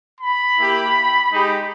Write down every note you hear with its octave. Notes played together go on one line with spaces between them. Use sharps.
B5
A#3 E4 G4
G#3 D#4 G4